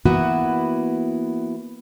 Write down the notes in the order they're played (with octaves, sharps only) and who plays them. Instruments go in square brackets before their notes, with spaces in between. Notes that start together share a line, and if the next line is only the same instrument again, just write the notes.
[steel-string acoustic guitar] E3 A#3 B3 E4 F#4 B4